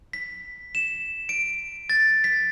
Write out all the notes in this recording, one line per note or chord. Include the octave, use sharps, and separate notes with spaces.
B6
E7
D7
A6
B6